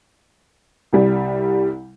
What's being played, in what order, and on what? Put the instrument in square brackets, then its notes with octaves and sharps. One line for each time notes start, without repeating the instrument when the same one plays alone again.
[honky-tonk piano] C2 G3